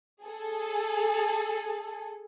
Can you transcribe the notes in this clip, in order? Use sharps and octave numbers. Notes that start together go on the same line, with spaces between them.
G#4 A4